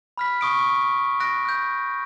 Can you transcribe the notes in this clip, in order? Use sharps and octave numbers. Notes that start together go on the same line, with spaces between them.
B5 F6 B6
C#6 D#6 D7
F#6 A#6 D7
F#6 G6